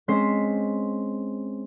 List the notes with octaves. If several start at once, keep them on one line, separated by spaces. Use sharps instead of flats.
G#3 C4 C#4 C5 B6 C7